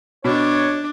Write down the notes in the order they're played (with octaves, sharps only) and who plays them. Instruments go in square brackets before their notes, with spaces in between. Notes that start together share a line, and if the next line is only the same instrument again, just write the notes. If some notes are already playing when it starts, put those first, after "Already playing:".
[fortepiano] B2 [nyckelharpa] D4 [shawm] C#5